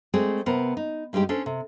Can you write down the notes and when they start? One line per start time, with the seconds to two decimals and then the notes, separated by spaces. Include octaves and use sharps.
0.14 G#3 A3 C4 G#4 D5
0.46 C3 B3 A#4 C5
0.77 D#4
1.13 G2 G3 G#3 D#4 G4
1.29 C#4 D4 A4 C5
1.46 C3